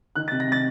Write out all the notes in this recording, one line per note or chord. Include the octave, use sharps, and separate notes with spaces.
D#3 F#6
C3 A6
A#6
C3 A6